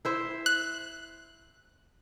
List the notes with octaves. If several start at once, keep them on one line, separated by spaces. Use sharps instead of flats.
E4 C5 E5
F#6